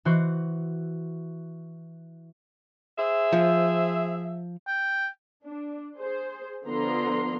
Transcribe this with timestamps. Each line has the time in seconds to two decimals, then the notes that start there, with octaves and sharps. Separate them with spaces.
0.05 E3 F#4 C5
2.98 G#4 C5 E5
3.33 F3
4.67 G5
5.45 D4
5.98 G#4 C5
6.66 D3 F3 B3 A#5 C6